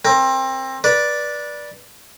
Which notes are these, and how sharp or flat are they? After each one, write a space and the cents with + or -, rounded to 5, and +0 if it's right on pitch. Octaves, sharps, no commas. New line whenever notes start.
C4 +25 A#4 +0
B4 -25 D5 +0